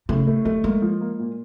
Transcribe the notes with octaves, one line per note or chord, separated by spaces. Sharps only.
A2 C#3
C#3 A3
D#3 A3
G#3 A#3
F3
A#3
A#2